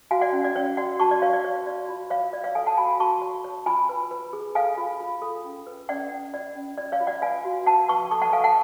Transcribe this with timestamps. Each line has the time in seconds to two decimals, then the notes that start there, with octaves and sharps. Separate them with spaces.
0.11 F#4 F5 G#5
0.21 D5 F#5
0.32 C#4
0.44 D5
0.56 C#4 C#5
0.77 F#4 D5 F#5
1.00 F#4 A5 C#6
1.11 D5
1.22 B4 C#5 F5
1.33 D5
1.44 F#4 C#5
1.66 F#4 D5
1.89 F4
2.10 C#5 F5
2.33 C#5 D5
2.44 C#5 F5
2.55 A4 F5 G#5
2.66 F#5 A5
2.77 F#4 G#5 B5
3.00 F#4 A5 C#6
3.22 C#5
3.45 C#5
3.66 F4 G#5 B5
3.89 B4
4.11 B4
4.33 G#4
4.55 A4 F5 G#5
4.77 F4
5.00 F4
5.22 A4
5.44 C#4
5.67 B4
5.89 C#4 D5 F#5
6.11 C#4
6.33 F4 D5
6.55 C#4
6.78 F4 D5
6.92 C#5 F5
7.00 F4
7.07 D5 F#5
7.22 B4 F5 G#5
7.45 F#4
7.66 B4 F#5 A5
7.88 B4 A5 C#6
8.11 A4 A5 C#6
8.22 F#5 A5
8.33 A4 F5 G#5
8.44 F#5 A5